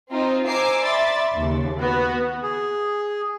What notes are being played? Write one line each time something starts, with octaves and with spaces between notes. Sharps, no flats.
C4 D#4 F4 C5
C5 G#5 A#5 D6 E6 C7
D5 E5 B5 C6 A6
D#2 C#3
B3 F#4
G#4